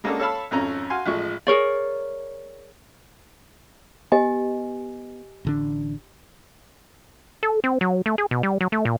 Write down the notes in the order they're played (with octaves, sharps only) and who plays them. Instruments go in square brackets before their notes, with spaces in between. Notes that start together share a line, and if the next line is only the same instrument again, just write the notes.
[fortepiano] G#3 A#3 C#4 D4 F#4 A4
A4 C#5 F5 A5 B5 E6
G#1 F2 C#4 A#5
F#4 F5 G#5 C6
A1 F3 G#3 C#6
[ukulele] G#4 A#4 C#5 D5
[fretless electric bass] B3 [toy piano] G4 D#5 G#5
[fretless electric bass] A1 D3 D4
[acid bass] A4
C4
F#3
A3
G#4
B2
G3
F#3
A3
A#2